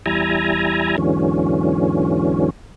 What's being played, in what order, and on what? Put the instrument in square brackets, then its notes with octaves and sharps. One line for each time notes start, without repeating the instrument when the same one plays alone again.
[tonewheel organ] E2 G3 E4 G#5 A#5
E2 G#2 D3 E3 F#3 C#4